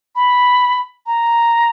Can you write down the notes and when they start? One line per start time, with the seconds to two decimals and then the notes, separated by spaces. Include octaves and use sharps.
0.15 B5
1.06 A#5